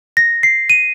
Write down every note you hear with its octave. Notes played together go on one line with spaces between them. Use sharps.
A#6
C7
D#7